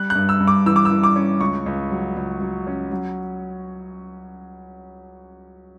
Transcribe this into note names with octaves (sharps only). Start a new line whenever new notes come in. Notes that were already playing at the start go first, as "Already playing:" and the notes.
Already playing: G3 F#6
F#6
G2
E6
G2
D6
E3 E6
D6
E6
E3
D6
C#4
C#2 C#6
C#2
F#3
C#2
F#3
C#4
F#3